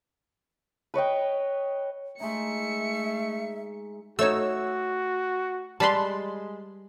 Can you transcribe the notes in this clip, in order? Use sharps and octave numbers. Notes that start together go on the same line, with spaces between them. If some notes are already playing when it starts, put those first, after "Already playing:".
B4 C#5 D#5 G5
G#3 A3 D#4 E5 C#7
A3 D#4 F#4 C#5 E6
G3 G#3 B4 A5 B5 C6